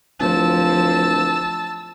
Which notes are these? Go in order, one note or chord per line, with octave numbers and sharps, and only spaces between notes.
D1 F3 A5 E6